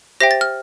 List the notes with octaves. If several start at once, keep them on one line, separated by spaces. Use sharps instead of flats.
G4 C5 E5 G5 A#6
A6
F6